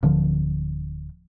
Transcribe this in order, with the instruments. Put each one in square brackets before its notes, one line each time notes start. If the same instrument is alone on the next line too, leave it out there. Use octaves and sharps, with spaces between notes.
[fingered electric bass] D1 D3 F3